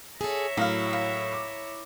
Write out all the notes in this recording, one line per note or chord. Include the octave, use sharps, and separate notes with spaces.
G#4 A4 C#5 E5 A#5
A2 F#3 A#3 E4 F5
A#3
D6